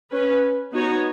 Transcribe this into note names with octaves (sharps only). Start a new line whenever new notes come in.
C#4 B4
B3 D#4 F#4 C#5